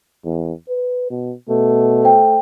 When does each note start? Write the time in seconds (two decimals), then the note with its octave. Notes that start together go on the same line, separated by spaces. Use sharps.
0.25 E2
0.69 B4
1.10 B2
1.49 B2 A3
2.03 C5 G5